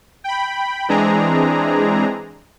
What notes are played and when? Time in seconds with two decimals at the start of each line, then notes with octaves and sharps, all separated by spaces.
0.24 G5 B5
0.89 E3 G#3 C4 D4 G#4 A#5